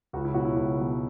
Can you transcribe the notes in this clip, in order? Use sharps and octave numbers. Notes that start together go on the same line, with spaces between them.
C#2 F#4
E4
B2 F#3 F#4
E4
C#2 F#4
B2 F#3